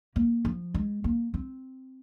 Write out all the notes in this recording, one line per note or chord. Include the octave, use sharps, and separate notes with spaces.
A#3
F3
G#3
A#3
C4